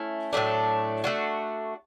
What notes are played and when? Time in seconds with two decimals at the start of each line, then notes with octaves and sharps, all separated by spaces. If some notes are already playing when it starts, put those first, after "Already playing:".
Already playing: A3 C#4 E4
0.33 A2 F#3 A3 D4
1.04 A3 D4 F#4